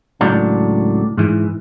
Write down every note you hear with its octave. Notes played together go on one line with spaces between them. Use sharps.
C#2 A2 F#3 D4
G#2 E3